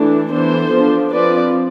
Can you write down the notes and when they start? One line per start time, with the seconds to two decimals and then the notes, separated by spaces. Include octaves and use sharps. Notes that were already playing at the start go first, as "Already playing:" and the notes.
Already playing: E3 A3 D4
0.30 E3 B3 D4 A4 C5
0.72 F3 B3 D4
1.12 F3 C4 B4 D5